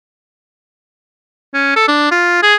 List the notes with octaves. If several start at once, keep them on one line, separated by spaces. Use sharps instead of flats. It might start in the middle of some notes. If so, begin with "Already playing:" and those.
C#4
A4
D4
F4
G#4